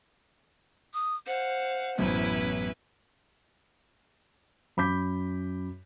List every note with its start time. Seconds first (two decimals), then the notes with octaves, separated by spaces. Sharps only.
0.94 D#6
1.27 C5 F5 F#5
1.98 A1 F#2 B2 C#4 E4 B4
4.77 F#2 B5 D6 G6 B6